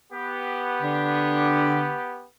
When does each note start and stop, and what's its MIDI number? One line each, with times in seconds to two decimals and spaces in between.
0.13 2.25 59
0.13 2.25 67
0.82 1.97 50